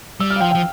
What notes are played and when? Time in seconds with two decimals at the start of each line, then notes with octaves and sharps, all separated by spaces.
0.20 G3 E6
0.30 F6
0.36 F5
0.41 F3 G5
0.51 G5
0.55 F3